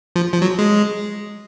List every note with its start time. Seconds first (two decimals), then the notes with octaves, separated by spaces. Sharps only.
0.16 F3
0.33 F3
0.42 F#3
0.59 G#3